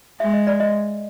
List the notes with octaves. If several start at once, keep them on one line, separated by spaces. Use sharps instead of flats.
G#3 E5
D#5
D5
D#5